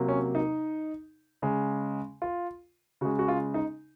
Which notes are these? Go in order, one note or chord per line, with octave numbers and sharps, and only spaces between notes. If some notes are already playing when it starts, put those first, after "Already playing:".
Already playing: C3 F#3 A#3
C#4
D#4
C#3 G#3
F4
C#3 G#3 F#4
F#4
F4
D#4